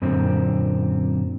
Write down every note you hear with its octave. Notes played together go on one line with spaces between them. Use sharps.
F#2 A#2 D3 C4